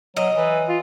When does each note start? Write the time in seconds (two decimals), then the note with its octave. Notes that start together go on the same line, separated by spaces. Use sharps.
0.17 F#3 D#5
0.36 E3
0.68 F4